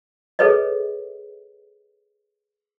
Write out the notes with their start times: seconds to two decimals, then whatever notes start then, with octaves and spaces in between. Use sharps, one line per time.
0.39 G#4 A4 B4 C#5 D#5